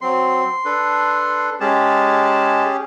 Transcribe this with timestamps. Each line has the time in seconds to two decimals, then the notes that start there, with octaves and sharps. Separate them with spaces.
0.01 F#3 C4 C6
0.65 D4 A4 B4
1.60 G#3 C#4 G4 G#4 A5